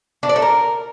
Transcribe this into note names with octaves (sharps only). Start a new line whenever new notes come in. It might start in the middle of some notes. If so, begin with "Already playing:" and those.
D4
D5
A4
A#4